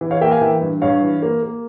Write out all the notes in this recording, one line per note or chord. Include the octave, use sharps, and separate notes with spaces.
E3
C#5 F5
A#3 E5 G5
F5 G#5
E3 E5 G5
G2
G2 C#5 F5
E3
A#3
A#3